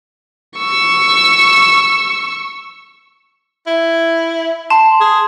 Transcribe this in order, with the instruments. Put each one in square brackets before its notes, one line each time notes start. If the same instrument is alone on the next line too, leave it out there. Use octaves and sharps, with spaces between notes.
[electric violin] C#6 E6
[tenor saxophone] E4
[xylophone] A5 [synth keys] C6
[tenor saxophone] G#4